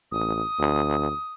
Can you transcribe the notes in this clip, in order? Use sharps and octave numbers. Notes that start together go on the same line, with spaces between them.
A1 D#6
D2